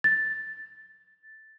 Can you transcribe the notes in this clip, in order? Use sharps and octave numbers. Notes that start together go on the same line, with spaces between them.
A6